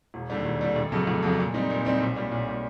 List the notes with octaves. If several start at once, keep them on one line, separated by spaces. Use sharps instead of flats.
E1
D#2 D3 G3
E1
D#2 D3 G3
F1
F2 C#3 F#3 A3
F1
F2 C#3 F#3 A3
A#2
G3 C4 D#4
A#2
G3 C4 D#4
B1
A#2 G3
B1
A#2 G3